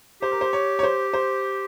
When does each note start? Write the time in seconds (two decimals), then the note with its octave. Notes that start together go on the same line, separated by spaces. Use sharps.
0.22 G4 C5
0.32 A#4
0.41 C5
0.53 C#5
0.79 C#5
0.83 C5
1.14 C5